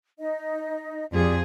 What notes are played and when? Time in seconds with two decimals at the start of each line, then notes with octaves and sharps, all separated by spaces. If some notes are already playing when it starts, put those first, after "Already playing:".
0.19 D#4 D#5
1.12 F2 F4 G4 G#4 D5